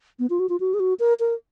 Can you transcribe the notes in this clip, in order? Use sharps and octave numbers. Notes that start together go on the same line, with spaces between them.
B3
F4
F#4
F4
F#4
G#4
F#4
A#4
A#4